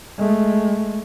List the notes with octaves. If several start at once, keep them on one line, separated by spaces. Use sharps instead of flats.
G#3 A3